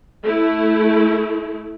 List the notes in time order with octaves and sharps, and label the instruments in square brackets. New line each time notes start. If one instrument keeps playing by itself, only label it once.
[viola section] A3 E4